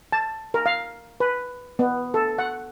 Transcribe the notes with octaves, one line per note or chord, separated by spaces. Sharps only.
A5
A#4
F5
B4
B3
A4
F#5